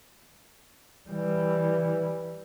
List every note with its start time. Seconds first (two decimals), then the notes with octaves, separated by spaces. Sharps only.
1.10 E3 G3